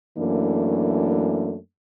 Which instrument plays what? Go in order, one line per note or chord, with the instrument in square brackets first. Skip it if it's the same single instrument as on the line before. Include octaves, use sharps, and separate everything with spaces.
[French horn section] F#2 E3 A3 A#3 D4